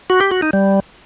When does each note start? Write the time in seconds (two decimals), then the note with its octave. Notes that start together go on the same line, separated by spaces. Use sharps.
0.10 F#4
0.21 G4
0.31 F#4
0.42 D#4
0.53 G3